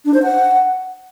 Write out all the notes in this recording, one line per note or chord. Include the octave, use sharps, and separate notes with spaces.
D4
C5
F#5